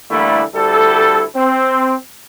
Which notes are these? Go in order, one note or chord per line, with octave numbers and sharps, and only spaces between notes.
D3 E3 G3 A3 A#3 E4
D2 G3 E4 A4
C4